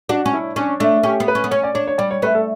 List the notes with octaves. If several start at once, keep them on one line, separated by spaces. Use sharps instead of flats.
D4 F#4
C#4
E4
C#4 D4
A3 D4
C#4 G4
B3
B4
C#4
B3
C#4 C#5
D5
D4 C#5
C#5
G3 D5
C#5
A3 B4
A4